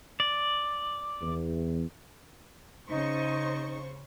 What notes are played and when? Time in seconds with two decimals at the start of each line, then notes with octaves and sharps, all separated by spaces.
0.20 D5
1.21 E2
2.89 C#3 D#4 C5 C#6